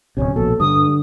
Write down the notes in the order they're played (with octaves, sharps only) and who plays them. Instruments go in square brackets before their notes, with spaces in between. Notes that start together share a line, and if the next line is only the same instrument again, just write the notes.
[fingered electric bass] D1 G1 C3 [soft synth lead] C#4
[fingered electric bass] A#1 B2 [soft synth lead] A4
[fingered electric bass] G2 [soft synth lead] D3 [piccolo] D#6